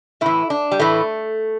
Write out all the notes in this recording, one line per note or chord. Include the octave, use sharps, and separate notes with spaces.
A2 E3 E4
D4
G3
A2 E3 A3